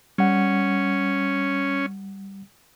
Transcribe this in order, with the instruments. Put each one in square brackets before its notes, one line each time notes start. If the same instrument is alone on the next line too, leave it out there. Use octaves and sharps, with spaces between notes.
[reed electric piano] G3 F#5 [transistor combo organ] C#4